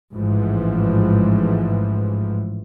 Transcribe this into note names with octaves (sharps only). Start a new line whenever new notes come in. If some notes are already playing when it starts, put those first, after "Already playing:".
A1 G#2 E3 F3